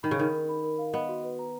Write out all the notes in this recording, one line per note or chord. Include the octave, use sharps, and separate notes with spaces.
D#3 B5
C#3
D#3 A#4
A#4
B5
A#4
F5
B3 D#5
F#4
B4
A#5